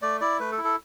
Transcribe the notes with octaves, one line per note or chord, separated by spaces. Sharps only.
A3 D5
E4 D5
A3 B4
A4
E4
A4